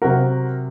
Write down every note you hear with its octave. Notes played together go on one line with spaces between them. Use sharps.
C3 F#3 F#4 A#4